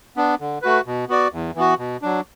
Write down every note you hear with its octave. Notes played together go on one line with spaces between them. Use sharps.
B3 D4
D3
A3 F#4 B4
B2
B3 F#4 D5
E2
E3 B3 F#4
B2
F#3 D4